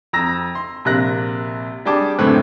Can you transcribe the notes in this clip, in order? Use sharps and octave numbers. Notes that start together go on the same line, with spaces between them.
F2 A#5 E6 A#6
C6
A#1 C3 A#3 F#6 A#6
G3 D4 G#4 G5 A5 D6
F#1 A2 D3 C4 B4 F#6